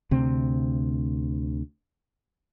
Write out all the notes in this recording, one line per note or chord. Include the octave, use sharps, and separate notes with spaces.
D2 C3 C4